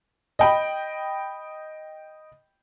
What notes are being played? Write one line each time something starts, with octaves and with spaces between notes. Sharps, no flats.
D#5 G5 B5